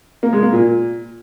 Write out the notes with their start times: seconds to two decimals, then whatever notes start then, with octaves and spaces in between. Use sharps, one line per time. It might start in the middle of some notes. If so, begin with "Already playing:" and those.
0.23 A#3
0.33 G#3
0.43 A#3
0.53 A#2